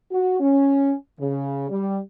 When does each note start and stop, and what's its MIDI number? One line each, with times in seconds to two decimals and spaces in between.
0.11 0.40 66
0.41 0.93 61
1.19 1.67 49
1.70 1.99 55